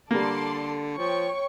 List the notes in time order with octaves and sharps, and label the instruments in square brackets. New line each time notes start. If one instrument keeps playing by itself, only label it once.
[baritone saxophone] D3 [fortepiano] G3 A#3 [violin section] A4 D5 C6
[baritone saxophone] F3 [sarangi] C#5 [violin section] G5 C#6